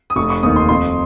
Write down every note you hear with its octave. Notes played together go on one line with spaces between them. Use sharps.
D#6
F1 C#6
C#6
D#2 D#3 D#6
C6
F2 C6